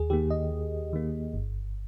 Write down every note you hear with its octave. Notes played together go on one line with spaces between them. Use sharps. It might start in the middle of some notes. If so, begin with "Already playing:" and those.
Already playing: D#2 G#4
D#3 A#3 G4
D#5
D#2
D#3 A#3
G1